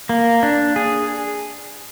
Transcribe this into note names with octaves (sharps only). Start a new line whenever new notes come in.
A#3
D4
G#4